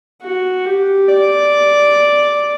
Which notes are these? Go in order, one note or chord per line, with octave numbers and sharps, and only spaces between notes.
F#4
G4
D5